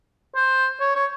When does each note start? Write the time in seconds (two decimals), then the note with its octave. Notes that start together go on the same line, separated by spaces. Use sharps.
0.35 C5
0.80 C#5
0.95 C#5